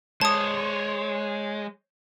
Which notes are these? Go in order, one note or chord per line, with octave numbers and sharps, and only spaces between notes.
G#3 C5 C#5 A5 D#6